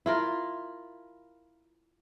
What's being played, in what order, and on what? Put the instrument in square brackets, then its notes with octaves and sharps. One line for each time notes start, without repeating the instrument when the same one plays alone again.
[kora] E4 F4 A#4